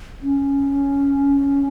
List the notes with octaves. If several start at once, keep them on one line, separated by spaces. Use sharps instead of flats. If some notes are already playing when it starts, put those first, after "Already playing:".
C#4